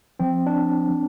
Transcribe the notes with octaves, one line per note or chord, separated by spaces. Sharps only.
F3 C4
D4